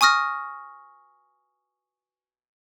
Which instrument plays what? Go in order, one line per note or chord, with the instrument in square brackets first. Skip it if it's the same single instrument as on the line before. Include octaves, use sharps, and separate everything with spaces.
[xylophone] G#5 C#6 D#6 F6 A#6